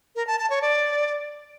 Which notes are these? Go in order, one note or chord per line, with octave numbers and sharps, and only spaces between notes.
A#4
A5
A5
C#5
D5